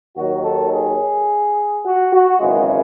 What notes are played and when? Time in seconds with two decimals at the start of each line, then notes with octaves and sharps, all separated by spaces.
0.16 D#2 D#3 F#3 F#4
0.43 A4
0.72 G#4
1.84 F#4
2.12 F#4
2.39 G#1 F#2 C#3 E3 G#3